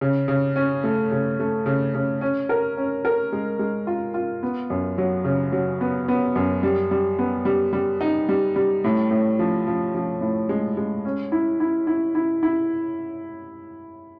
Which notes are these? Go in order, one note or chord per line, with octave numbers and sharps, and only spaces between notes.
C#3
C#3
C#4
A3
C#3
A3
C#3
C#3
C#4
A#4
C#4
A#4
G#3
G#3
F4
F4
B3
F#2
F#3
C#3
F#3
B3
B3
F#2
G3
G3
B3
G3
G3
D#4
G3
G3
A2
A2
F3
F3
F3
A2
G#3
G#3
C#4
E4
E4
E4
E4
E4